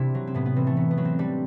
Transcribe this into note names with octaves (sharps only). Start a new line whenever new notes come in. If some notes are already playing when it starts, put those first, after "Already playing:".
Already playing: C3 C4 D4 E4
F#3
C4
A2 B3
B3
E3 C4
A3
F#3 B3
B3
F#3
C4
G3 D4